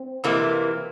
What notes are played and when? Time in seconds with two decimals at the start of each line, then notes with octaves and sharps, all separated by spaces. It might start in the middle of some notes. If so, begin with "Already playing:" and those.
Already playing: C4
0.24 F2 C3 E3 A#3